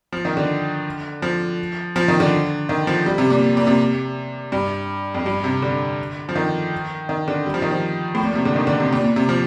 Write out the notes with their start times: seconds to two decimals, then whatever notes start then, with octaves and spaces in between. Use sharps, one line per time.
0.12 F3
0.25 D#3
0.37 D3
1.22 F3
1.96 F3
2.08 D#3
2.20 D3
2.69 D#3
2.87 F3
3.06 G3
3.18 C3
3.30 A#2
3.57 A#2
3.67 C3
4.52 G2
5.14 F2
5.26 G2
5.44 C3
5.62 D3
6.29 F3
6.35 D#3
7.09 D#3
7.28 D3
7.46 G3
7.54 F3
7.62 D#3
7.71 F3
8.15 A2
8.25 A#2
8.35 C3
8.45 D3
8.56 D#3
8.67 D3
8.80 C3
8.93 A#2
9.04 A#2
9.16 C3
9.29 F3